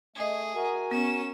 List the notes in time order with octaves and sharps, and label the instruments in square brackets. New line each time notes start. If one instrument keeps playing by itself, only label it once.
[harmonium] A3 [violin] G#4 [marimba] D#5 G#6
[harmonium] F#4 A#4 G#5
[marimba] B3 [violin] C#4 E7